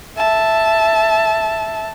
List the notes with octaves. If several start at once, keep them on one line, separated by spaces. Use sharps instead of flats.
E5 A5